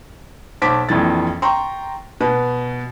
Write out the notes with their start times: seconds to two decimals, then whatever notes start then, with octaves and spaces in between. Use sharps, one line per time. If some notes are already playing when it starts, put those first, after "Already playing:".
0.62 B1 C5 A5 D6 B6 D7
0.89 A#1 F2 E3 A6
1.42 G5 A#5 C6 C#6
2.21 B2 B4